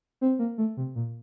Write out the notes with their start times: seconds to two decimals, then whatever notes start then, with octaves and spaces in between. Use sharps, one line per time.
0.21 C4
0.39 A#3
0.58 A3
0.77 C3
0.95 A#2